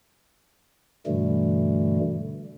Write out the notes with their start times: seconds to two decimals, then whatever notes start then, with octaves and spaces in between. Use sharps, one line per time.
1.07 G2 B2 D3 E3 G3 A3